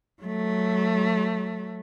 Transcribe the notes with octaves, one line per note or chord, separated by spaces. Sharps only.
F#3 A3